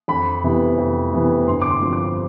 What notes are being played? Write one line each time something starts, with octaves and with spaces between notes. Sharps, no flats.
F2 B5
C3 E3 B3 E4
F2
C3 E3 B3 E4
G1 C6
D6
C6
G2 F3 C4
D6